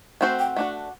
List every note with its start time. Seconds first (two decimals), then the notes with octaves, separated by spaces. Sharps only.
0.21 A3 C4 F#4 C5 G5
0.39 G5
0.56 A3 D4 F#4 F#5